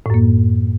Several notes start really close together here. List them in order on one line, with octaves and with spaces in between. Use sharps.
A2 F#2 A#3